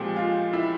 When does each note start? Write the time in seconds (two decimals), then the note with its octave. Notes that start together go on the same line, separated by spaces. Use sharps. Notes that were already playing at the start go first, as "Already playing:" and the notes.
Already playing: A#2 F3 G#3 C4 G4 G#4
0.16 F4
0.53 E4